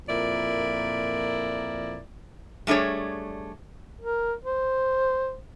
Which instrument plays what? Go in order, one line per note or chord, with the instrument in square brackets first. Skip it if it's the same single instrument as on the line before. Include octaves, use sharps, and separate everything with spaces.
[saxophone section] F2 A#2 E4 A#4 D5
[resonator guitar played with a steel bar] G3 A3 D4 G#4 C#5
[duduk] A#4
C5